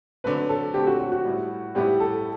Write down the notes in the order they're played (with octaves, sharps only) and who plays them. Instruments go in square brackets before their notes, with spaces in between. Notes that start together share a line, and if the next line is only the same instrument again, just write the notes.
[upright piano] D3 F#3 A3 C4 [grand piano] B4
[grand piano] A4
[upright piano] D3 F#3 A3 C4 [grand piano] G4
[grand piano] F#4
F#4
F#4
[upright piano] A2 G3 B3 E4
[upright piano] A2 G3 B3 E4 [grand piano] G4
[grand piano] A4